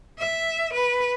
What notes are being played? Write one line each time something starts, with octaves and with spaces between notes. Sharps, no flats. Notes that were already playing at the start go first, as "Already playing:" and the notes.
E5
B4